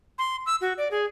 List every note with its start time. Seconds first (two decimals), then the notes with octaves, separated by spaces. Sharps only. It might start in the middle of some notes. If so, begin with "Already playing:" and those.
0.18 C6
0.46 E6
0.61 F#4
0.78 D5
0.91 G#4